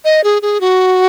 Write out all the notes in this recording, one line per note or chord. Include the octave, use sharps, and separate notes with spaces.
D#5
G#4
G#4
F#4